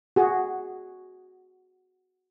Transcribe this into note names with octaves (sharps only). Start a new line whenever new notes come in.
F#4 G#4